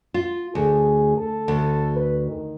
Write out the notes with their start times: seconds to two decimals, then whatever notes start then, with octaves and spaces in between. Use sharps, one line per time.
0.14 F4
0.55 D2 G#4
1.17 A4
1.48 D2
1.96 B4
2.26 D#3